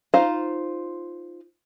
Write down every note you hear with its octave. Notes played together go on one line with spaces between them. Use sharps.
D#4 F4 C5 F5